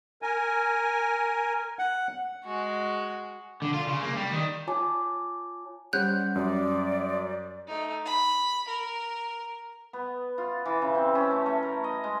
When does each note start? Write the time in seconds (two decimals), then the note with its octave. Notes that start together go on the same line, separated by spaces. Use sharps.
0.22 A#4 G#5
1.79 F#5
2.45 G#3 F#4
3.62 D3
3.74 F4
3.87 C#3
4.02 A#3
4.16 G3
4.32 D#3
4.67 F4 C#5 G#5 A5 D6
5.93 G3 C#4 C5 F#5 F#6 G6
6.36 F#2 D5
7.67 A3 D#4
8.06 B5
8.68 A#4
9.93 B3
10.38 F4
10.66 E3
10.82 C#3
10.95 C4
11.15 C#4
11.31 A3
11.46 A3
11.63 A#4
11.84 D#5
12.04 G#3